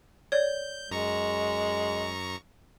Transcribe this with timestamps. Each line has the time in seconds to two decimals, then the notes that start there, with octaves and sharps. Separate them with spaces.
0.32 C#5 D5 G6
0.91 F#2 G#3 A#5 C#6